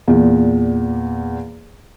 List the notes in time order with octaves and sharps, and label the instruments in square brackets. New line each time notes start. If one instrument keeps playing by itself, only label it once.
[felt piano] E2 A#2